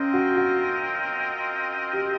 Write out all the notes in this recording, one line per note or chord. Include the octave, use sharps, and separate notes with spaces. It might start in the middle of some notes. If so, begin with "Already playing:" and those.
Already playing: C4 C#4 F4 A#4 D#5 G5
F#4
F#4
G4